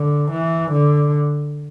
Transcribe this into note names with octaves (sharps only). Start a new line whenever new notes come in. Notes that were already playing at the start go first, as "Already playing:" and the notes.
Already playing: D3
E3
D3